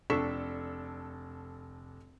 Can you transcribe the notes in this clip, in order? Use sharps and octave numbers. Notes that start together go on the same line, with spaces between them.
F1 D4 A4 C#6 B6 E7